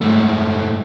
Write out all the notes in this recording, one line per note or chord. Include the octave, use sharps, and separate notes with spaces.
G#2 A3